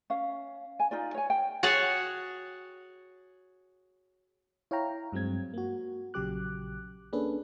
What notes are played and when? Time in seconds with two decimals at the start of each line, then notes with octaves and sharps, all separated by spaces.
0.10 C#4 F5
0.80 G#5
0.91 D#4 F4 D5
1.14 C#5 G#5
1.30 G5
1.63 F#4 G#4 C#5 G#5 A5
4.71 E4 C#5 F5 G5 A#5
5.12 G2 F#3 G#3 C4 G#6
5.54 A#3 F#4
6.14 A#1 C#3 F#3 G4 D6 F#6
7.13 A#3 C#4 D4 G#4 A4 B4